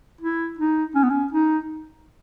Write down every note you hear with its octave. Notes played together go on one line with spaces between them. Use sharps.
E4
D#4
C#4
B3
C#4
D#4